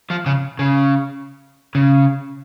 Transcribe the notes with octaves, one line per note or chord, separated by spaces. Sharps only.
F3
C#3
C#3
C#3